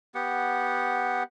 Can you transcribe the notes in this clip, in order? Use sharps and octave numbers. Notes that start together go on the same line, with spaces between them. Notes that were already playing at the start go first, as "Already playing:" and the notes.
B3 G4 F#5